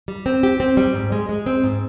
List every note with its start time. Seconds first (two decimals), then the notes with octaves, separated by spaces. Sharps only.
0.08 G3
0.26 C4
0.43 G4
0.60 C4
0.77 G3
0.94 G#2
1.12 G#3
1.29 G#3
1.46 C4
1.64 G#2